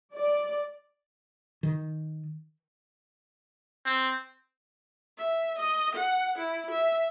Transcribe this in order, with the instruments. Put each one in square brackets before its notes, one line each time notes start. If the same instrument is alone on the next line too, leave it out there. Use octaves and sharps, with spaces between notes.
[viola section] D5
[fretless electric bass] D#3
[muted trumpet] C4
[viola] E5
D#5
F#5
E4
E5